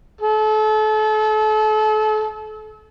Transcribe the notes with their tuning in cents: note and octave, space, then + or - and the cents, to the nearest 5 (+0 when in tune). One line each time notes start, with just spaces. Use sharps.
A4 -35